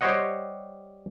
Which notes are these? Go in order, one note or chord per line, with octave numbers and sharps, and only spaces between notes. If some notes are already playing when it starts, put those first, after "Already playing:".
G3 G4 C5 C#5 D#5 F#5